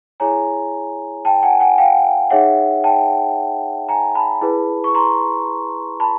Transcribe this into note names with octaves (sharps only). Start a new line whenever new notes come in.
E4 G#4 C#5 G#5 A#5
G5 A5
F#5 G#5
F#5 G#5
F5 G5
D#4 G#4 C#5 E5 F#5
G5 A5
G#5 A#5
A5 B5
E4 G#4 B4
C#6
A#5 C6
A5 B5